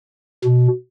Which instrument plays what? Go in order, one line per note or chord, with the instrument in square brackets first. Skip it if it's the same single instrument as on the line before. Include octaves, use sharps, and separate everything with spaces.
[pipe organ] B2